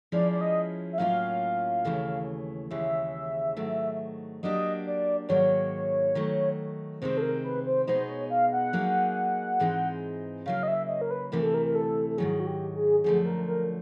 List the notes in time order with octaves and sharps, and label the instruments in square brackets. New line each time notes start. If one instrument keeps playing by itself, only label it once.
[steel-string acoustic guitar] F3 G#3 C#4 E4 [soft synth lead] D5
[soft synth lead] D5
D#5
E5
[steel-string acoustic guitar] A2 F#3 A#3 C#4 F4 [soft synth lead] F5
[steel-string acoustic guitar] D#2 C#3 E3 A3
[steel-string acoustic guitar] D#2 C#3 E3 G#3 [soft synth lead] E5
[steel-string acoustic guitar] G#2 D#3 F#3 A3
[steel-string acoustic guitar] F#3 A#3 D4 G4 [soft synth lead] D#5
[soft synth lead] D5
[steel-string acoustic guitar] G#2 D#3 F#3 A#3 [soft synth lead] C#5
[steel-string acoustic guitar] D#3 F#3 A3
[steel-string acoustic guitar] C3 D#3 G#3 C4 [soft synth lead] C5
[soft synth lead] A4
A#4
B4
C5
[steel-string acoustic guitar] B2 G#3 B3 D#4 G#4 [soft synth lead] C5
[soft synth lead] C#5
F5
F#5
[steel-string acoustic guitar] F#3 A#3 D#4 G#4
G#2 E3 G#3 C4 D#4
[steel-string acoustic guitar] C#3 F#3 A#3 [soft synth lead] F5
[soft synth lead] D#5
E5
D#5
A#4
B4
[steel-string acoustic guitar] D2 C3 E3 A3 [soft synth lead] A#4
[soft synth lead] A4
A#4
A#4
A4
A4
[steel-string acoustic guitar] G#2 D#3 F#3 [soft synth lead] G#4
[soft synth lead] F#4
G4
G#4
[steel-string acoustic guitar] F#2 D3 F3 A3 [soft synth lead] G#4
[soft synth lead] A#4
A#4